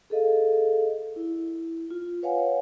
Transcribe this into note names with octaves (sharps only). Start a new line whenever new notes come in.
G#4 A4 D#5 F5
E4
F4
B4 C#5 F5 F#5 G#5